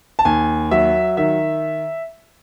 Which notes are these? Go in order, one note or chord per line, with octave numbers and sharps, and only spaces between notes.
A5
D#2 G#5
F#3 E5
D#3 E5